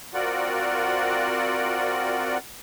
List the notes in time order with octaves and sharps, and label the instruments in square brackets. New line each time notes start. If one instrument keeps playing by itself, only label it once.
[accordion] C4 F4 F#4 A#4 D5 F#5